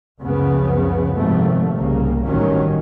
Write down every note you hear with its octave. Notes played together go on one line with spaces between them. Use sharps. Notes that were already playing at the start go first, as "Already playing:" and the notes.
C#2 F#2 C#3 F3 B3
G#1 C3 F3 A3
C2 C#3 A#3
A1 G2 D#3 F#3 C#4